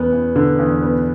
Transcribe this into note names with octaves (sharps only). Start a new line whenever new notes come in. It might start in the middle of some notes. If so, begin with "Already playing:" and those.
Already playing: E2 B3
E2
D3
E2
B3